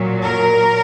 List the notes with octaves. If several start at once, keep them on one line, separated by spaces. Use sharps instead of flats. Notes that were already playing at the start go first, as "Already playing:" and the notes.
Already playing: A#2 F#3
A#4